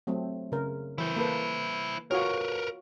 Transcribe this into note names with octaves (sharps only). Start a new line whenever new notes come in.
F#3 A3 C4
C#3 A#4
E3 E4 C5
A#3 A4 B4
F4 F#4 A#4 B4 C#5